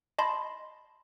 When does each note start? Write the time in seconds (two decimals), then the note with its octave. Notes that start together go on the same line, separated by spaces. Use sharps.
0.18 D#5 A5 B5 C6